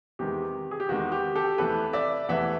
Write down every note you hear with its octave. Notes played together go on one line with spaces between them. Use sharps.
E2 C3 D#3 G#3 G4
G#4
G4
E2 C3 D#3 G#3 F#4
G4
G4 A4
E2 C3 E3 A3 A4 B4
D5 E5
E2 C3 E3 A3 E5 F#5